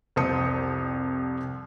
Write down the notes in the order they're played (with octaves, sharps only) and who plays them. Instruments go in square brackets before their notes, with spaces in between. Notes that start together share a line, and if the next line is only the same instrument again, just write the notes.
[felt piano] C2 F2 C5 A5 D#6 C#7